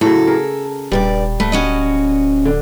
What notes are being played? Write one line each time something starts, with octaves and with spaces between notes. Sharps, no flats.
A2 C#3 F#3 A4
G#4 A#4
D#1 G2 G3 A#4 D5
D1 A3 B4
C#4 F#4 D#5
D3